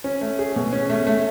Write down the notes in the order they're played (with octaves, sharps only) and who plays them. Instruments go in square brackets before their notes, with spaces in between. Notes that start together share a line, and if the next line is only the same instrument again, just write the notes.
[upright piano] C#4
A3
G#4
B2
C#4
A3
A3